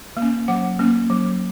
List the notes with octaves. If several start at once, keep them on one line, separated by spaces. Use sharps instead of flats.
A#3
C#4
F#3 F#5
A#3 C#4
F#3